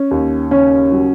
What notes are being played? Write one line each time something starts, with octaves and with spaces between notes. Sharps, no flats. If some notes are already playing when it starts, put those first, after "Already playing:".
Already playing: C#4
D#2
C#3 C#4
F#3